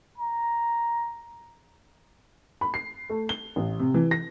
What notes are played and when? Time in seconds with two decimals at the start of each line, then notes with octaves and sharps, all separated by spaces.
0.18 A#5
2.61 B5
2.74 C7
3.10 A3
3.29 G7
3.56 A1
3.79 C3
3.94 E3
4.11 A#6